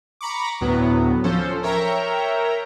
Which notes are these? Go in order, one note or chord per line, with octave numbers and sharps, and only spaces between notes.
A#5 B5 C#6 D6
D2 A2 F#3 B3
F3 C#4 A4 C5
A#4 C#5 E5 G5 A#5